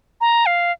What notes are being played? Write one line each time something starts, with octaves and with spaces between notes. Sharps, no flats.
A#5
F5